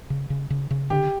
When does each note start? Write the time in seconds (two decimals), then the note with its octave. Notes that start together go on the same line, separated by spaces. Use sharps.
0.10 C#3
0.30 C#3
0.50 C#3
0.71 C#3
0.90 D3 G4